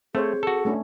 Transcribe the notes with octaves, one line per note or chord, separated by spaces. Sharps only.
A3 C4 G#4 C5 C#5
F#4 A4
A3 C#4 D4